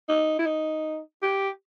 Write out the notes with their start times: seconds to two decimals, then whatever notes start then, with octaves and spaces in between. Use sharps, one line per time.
0.09 D#4
0.39 E4
0.46 D#4
1.23 G4